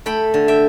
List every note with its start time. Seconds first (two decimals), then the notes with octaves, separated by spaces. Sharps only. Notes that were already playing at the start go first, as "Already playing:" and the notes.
0.06 A3 G5 B5
0.34 D3
0.48 E5 G5